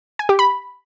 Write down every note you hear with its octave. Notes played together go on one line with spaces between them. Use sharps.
G#5
G4
B5